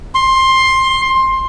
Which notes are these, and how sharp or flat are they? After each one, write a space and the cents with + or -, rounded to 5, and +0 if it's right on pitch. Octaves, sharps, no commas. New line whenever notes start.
C6 +15